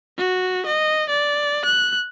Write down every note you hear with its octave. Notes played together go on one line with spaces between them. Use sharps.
F#4
D#5
D5
F#6